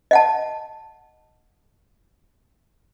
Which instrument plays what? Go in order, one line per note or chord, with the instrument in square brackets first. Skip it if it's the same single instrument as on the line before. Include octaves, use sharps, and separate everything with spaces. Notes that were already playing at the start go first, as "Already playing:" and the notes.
[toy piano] D#5 F#5 A5